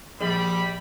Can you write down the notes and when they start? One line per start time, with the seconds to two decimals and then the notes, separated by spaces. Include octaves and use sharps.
0.21 A#1 G3 B5